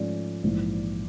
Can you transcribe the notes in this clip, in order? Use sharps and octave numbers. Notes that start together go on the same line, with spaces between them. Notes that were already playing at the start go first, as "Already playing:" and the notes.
Already playing: G#2 F3 A3 C#4 D5
A#1 G#2 E3